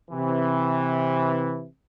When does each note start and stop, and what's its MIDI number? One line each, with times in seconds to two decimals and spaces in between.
0.11 1.65 48
0.11 1.65 52